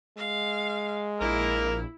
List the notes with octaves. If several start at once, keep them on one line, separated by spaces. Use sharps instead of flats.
G#3 F5
A#1 A#3 E4 A#4